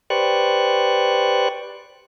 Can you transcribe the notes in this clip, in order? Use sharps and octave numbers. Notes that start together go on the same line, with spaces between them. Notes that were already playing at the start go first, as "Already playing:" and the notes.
G4 B4 C5 D5 C#6 F#6